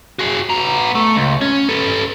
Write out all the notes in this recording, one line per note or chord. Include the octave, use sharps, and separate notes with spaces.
F#4 G#4
B3 A#5
A3
C#2
C#4
A4 B4